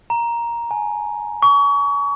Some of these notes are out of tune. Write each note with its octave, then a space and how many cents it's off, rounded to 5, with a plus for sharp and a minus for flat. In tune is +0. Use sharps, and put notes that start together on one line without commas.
A#5 +10
G#5 +20
C#6 +35